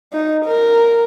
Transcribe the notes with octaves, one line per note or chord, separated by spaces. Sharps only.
D#4
A#4